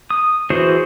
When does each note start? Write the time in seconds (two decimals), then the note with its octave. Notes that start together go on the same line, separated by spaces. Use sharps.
0.10 D#6
0.50 E3 F#4 G#4 C5